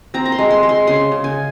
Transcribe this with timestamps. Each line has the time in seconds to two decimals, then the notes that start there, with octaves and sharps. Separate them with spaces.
0.14 C4 A#5
0.25 A#5
0.32 C6
0.38 G#3
0.50 C6
0.63 G#3
0.69 C6
0.87 C#3 C6
1.12 C#3
1.24 G#5